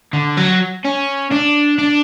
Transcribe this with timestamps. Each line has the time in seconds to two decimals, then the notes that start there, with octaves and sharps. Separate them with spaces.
0.13 D3
0.37 F#3
0.85 C#4
1.31 D4
1.78 D4